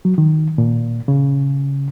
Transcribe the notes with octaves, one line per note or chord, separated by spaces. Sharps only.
F#3
D#3
A#2
C#3